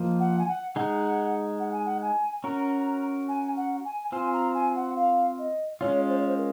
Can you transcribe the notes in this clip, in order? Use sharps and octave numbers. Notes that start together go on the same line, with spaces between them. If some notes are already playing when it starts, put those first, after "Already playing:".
Already playing: F3 A#3 F4 C5 D#5
F#5
G#5
F#5
G#3 D#4 G#4 F#5
F#5
G#5
F#5
G#5
C#4 F#4 A#4 A#5
G#5
F#5
G#5
C4 F4 C5 G#5
A#5
G#5
F#5
F5
D#5
G#3 C#4 F4 C#5
C5
C#5
C5
A#4